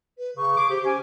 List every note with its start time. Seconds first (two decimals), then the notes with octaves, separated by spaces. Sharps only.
0.17 B4
0.37 C#3 C#6
0.57 G#4 D6
0.70 G4 C5
0.86 C#4 G#5